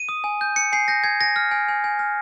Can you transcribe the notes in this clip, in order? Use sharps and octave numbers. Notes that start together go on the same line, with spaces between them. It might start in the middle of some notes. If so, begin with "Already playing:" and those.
Already playing: D#7
D#6
G#5
G6
G6 C#7
G#5 C7
G6 A#6
G#5 G#6
G#5 A#6
F6
G#5
G#5
G#5
F6